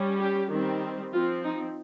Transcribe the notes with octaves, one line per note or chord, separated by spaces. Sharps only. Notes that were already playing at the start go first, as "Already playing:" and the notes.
Already playing: G3 C#4
G4
D#3 G3 C4
F3 C4 F4
D#4